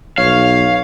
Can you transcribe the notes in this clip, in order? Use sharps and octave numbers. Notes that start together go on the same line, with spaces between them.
B1 C#5 F5